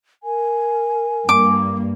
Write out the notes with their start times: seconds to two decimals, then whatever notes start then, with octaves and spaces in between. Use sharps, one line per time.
0.23 A#4 G#5
1.29 G2 A#3 D6